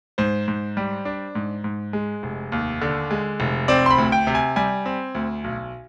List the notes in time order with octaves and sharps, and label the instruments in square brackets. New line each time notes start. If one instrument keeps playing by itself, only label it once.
[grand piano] G#2 C5
G#2
G3
D4
G#2
G#2
G#3
F1
D#2
D3
G#3
F1
C4 D5
C6
B5
D2
G5
C3
G#5
G3 G#5
C4
D2
B1